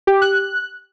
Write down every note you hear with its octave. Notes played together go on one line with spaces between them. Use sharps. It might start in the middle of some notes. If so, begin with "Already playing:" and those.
G4
F#6